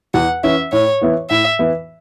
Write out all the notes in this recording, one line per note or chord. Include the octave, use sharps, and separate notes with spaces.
E2 F#5
E3 C#4 E4 E5
A2 C#5
E3 B3 E4
A2 E5
E3 B3 E4